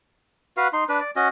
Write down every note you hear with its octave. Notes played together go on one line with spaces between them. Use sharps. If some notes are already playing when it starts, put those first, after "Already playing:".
F#4 B4 F5
D#4 C6
D4 B4
D5
C#4 F#4 D#5